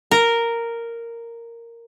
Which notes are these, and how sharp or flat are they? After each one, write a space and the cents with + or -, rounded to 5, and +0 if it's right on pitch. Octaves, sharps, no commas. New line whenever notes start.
A#4 -5